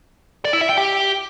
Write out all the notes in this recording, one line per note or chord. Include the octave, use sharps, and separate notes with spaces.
D5
E4
E5
G5
G4